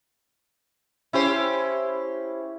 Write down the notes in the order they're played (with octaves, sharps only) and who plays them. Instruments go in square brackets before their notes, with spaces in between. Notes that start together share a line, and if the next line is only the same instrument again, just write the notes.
[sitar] C#4 G4 C5 [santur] E4